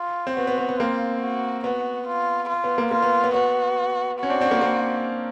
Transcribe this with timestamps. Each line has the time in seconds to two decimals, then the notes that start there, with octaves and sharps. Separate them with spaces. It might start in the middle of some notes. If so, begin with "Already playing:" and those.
Already playing: F4
0.27 C4
0.37 B3 F#4
0.47 B3
0.58 B3
0.69 B3
0.80 A#3 C4 F4
1.22 F#4
1.64 B3 F#4
2.07 F4
2.49 F4
2.64 B3
2.78 A#3
2.91 A#3 F4
3.02 B3
3.24 B3
3.34 B3 F#4
4.19 C#4 F#4
4.30 C4 D4
4.41 C4 D4
4.51 A#3 C4
4.62 A#3 C4